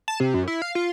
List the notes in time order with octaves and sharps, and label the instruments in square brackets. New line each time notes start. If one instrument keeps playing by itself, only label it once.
[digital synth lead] A5
C3
F#2
E4
F5
F4